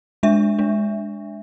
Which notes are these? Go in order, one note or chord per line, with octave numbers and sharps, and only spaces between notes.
G#3 D4 E5
G#3 D4